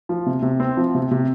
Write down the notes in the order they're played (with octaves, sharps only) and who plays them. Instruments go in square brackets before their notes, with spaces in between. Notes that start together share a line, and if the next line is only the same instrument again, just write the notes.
[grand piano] F3
C3
C3
C4
F3
C3
C3